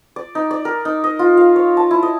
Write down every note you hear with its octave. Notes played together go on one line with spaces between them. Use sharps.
D5
D#4
D5
A#4
D#4
D#5
F4
F5
C#5
A5
E4
D#5